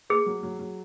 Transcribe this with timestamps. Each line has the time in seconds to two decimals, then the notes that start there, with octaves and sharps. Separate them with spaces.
0.10 A#3 G#4
0.26 F#3
0.43 F#3
0.59 F#3